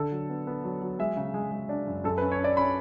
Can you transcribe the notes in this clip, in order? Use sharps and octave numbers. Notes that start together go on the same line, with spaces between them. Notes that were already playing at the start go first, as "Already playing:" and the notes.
Already playing: D3 A4
F#3
B3
B3
F#3
F#3
G#3 E5
C#3
G#3
G#3
D4
F#2
F#2 A4
C#4 B4
C#5
C#4 D5
C#4 B5